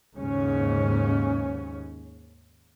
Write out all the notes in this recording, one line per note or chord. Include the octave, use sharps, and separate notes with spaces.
D#2 G#2 C#3 C#4